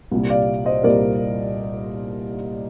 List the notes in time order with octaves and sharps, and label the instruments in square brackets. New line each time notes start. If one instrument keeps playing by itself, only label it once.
[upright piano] C2 A#2 G3
D5 F5
C5 D#5
C2 A#2 G3 A#4 D5